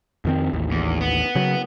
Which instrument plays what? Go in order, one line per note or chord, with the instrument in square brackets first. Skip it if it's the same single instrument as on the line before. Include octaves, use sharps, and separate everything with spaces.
[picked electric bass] F2 D#3 C4
A1 D#2
[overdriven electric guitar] E2
B3
[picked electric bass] C#3 F#3